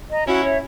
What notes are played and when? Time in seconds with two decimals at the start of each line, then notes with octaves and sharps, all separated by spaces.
0.10 D#5 A#5
0.26 C#4 E4 F#4
0.44 C#5 E5